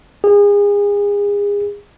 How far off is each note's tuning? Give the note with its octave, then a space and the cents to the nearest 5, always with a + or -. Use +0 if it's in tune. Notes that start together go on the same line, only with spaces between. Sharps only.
G#4 -30